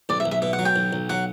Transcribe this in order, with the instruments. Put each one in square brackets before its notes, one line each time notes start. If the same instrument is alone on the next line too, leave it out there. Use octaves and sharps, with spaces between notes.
[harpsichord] B1 [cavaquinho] D5
[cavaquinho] E5
[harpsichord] B1
[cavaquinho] E5
[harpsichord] B2 [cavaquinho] E5
[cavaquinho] F#5
[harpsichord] F#3
[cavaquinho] G5
[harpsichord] B1
B1
[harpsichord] F#3 [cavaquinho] F#5